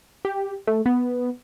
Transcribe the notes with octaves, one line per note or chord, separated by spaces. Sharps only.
G4
A3
B3